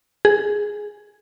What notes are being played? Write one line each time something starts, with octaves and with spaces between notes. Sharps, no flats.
G#4